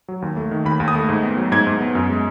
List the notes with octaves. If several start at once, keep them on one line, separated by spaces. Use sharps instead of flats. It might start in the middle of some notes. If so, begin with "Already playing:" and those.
F#3
D#2
A3
D#3
D#2 B5
D#2
D#6
A3
G#2
B3
F#3
G#2 G#6
G#2
B3
F#2
G#3